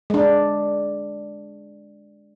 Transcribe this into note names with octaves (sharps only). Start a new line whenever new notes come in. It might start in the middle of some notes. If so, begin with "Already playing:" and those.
G#3 D4